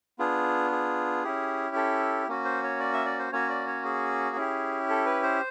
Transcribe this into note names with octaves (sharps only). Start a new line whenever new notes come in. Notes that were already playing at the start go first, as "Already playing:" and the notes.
B3 D4 F4 G#4
G#4
C#4 E4 G4
A4
A#3 C#4 F#4
C5
C#5
D5
E5
D5
C5
A#3 C#4 F#4 C#5
D5
C#5
G#4
C#4 E4 G4
A4
B4
C5